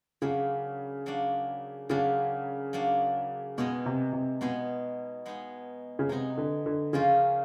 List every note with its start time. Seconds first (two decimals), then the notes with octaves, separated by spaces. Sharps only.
0.22 C#3 F#3 A#3 D4
1.06 F#3 A#3 D4
1.89 C#3 F#3 A#3 D4
2.73 F#3 A#3 D4
3.58 B2 G#3 B3 D#4 G#4
3.86 C3
4.13 C3
4.41 B2 G#3 B3 D#4 G#4
5.26 G#3 B3 D#4 G#4
5.99 C#3
6.09 C3 G#3 B3 D#4 G#4
6.38 D3
6.66 D3
6.93 C#3 F3 A#3 C#4 F4 A#4